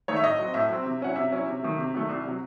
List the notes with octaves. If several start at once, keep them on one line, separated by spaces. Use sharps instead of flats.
D#3 A3 D#4 C#5
E5
A2 D#5
F#3 C4
A2 E5
F#3 C4
C3
F#3 C#4 E4 F#5
C3 E5
F#3 C#4 E4
C3
D#3 F#3 A3
C3
D#3 F#3 A3
C2
C3 F#3